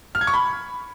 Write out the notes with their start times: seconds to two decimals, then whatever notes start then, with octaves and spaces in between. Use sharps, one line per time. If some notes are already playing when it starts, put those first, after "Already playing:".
0.15 F6
0.21 G#6
0.27 C#6
0.34 B5